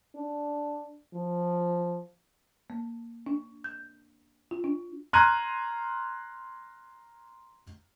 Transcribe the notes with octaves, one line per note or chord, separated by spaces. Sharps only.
D4
F3
A#3
D4
G6
F4
D4
A#5 C6 F6 F#6 G#6 D#7